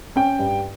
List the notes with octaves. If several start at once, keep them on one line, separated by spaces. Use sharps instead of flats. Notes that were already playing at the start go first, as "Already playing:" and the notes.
C#4 G5
G2